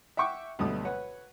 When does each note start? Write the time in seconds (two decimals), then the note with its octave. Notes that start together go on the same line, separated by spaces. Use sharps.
0.17 E5 F#5 G5 C#6 D6
0.59 D2 G2 B2 F#3 A3 D#6
0.85 B4 C#5 F#5